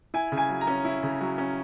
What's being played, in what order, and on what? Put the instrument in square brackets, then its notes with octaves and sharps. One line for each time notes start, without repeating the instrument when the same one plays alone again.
[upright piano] E4 G#5
C#3
G#5
F#3
A#5
C#4
E4
C#3
F#3
C#4